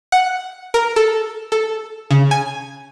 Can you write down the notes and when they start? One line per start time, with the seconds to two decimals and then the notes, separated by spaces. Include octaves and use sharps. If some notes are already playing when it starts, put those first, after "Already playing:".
0.12 F#5
0.74 A#4
0.96 A4
1.52 A4
2.11 C#3
2.31 G#5